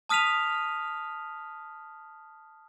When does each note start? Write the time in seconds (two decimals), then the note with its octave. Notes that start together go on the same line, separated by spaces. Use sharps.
0.09 A5 D#6 F6 B6 D#7 F7